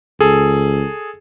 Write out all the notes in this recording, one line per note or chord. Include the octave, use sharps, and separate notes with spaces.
C#2 G#4 A4